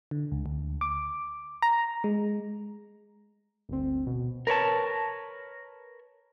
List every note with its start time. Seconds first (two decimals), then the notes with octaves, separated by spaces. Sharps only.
0.11 D3
0.32 C#2
0.46 D2
0.81 D6
1.62 A#5
2.04 G#3
3.69 G1 D2 C4
4.07 B2
4.47 A#4 B4 C#5 A5